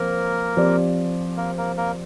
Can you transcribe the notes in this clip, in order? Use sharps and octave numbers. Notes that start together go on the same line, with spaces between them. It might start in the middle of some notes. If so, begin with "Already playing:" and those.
Already playing: F3 A#3 C4 A#4
F3 C4 G4 D5
A#3 A#4
A#3 A#4
A#3 A#4